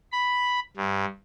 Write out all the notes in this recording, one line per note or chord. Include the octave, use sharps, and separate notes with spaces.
B5
G2